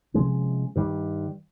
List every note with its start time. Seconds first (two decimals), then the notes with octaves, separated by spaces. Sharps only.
0.14 C3 F3 G#3 C#4
0.76 G2 D#3 G3